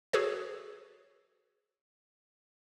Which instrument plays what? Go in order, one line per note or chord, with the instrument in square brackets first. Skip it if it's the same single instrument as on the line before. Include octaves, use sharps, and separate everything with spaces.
[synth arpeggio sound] F#4 G#4 A4 B4 C#5